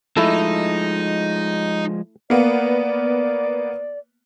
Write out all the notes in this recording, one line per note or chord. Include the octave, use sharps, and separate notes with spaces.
F3 G#3 A3 D#4 E4 A4
A#3 B3 D5